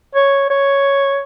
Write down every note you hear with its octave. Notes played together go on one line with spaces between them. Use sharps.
C#5
C#5